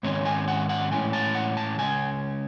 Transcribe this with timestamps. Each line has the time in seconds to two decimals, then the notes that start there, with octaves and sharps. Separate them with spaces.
0.03 G#2 D#3 G#3 C#4 C#5
0.25 G#5
0.48 F#5
0.69 F#5
0.91 A2 E3 G#3 C#4 G#5
1.13 A5
1.35 F#5
1.57 A5
1.78 C#3 G#3 C#4 G#5